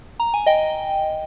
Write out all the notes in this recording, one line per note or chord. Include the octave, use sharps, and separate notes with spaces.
A#5
G#5
D#5 G5